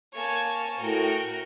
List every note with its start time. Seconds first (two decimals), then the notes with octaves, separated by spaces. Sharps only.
0.14 A#3 C#5 G#5 A5
0.80 A2 F#4 A#4 G5